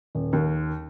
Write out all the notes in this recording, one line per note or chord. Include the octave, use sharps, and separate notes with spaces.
D#1
D#2